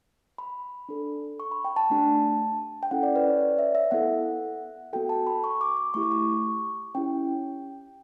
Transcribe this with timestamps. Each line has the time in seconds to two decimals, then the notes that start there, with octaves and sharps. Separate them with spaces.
0.38 B5
0.89 D4 A4
1.40 C#6
1.51 B5
1.65 G5
1.76 A5
1.90 A3 D4 G4
2.83 G5
2.91 C#4 E4 A4 F#5
3.03 D5
3.16 B4
3.29 C#5
3.41 D5
3.59 E5
3.75 E5
3.91 B3 E4 A4 F#5
4.93 B3 F#4 A4 G5
5.09 A5
5.27 B5
5.44 C#6
5.61 D6
5.77 D6
5.94 A3 E4 G4 C#6
6.03 D6
6.11 C#6
6.95 C#4 E4 G4 G5